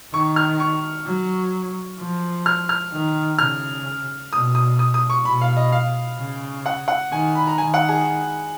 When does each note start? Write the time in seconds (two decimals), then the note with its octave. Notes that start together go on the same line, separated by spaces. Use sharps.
0.13 D#3 C#6
0.36 F6
0.60 C#6
1.06 F#3
1.99 F3
2.46 F6
2.69 F6
2.93 D#3
3.39 C#3 F6
4.32 B2 D#6
4.55 D#6
4.79 D#6
4.94 D#6
5.10 C#6
5.25 B2 B5
5.41 F5
5.57 D#5
5.72 F5
6.18 C#3
6.66 F#5
6.88 F#5
7.12 D#3 G#5
7.35 B5
7.47 A#5
7.58 D#3 G#5
7.74 F#5
7.89 G#4